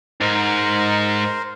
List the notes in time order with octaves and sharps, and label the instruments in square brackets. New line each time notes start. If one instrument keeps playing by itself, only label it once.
[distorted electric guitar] G#2 [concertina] A#4 C5